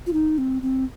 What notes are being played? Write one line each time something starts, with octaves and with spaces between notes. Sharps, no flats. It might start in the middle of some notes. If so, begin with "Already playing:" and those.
F4
D#4
C4
C4